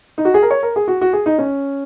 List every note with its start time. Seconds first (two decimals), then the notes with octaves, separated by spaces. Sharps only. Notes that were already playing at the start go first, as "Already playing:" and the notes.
0.18 D#4
0.25 F#4
0.34 G#4
0.42 A#4
0.51 C#5
0.63 A#4
0.76 G#4
0.88 F#4
1.01 F#4
1.13 G#4
1.26 D#4
1.39 C#4